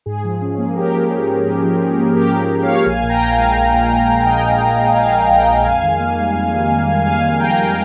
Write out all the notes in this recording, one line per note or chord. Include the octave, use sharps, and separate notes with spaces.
G#2 G#4
F3
C#4
A#3
G#2 G4 A#4
F3
C#4
A#3
G#2
F3
C#4
A#3
G#2 G4 A#4
F3
C#4
C#5 F5
A#3
A#1 F5 G#5
A#2
G5 A#5
A#1
F5 G#5
G#3
A#1
A#2
A#1
G#3
A#1 D#5 G5
A#2
A#1
G#3
A#1 F5 G#5
A#2
A#1 G5 A#5
G#3
F2 F5 G#5
D#3
A#3
G3
F2
D#3
A#3
G3
F2 F5 G#5
D#3
A#3 G5 A#5
G3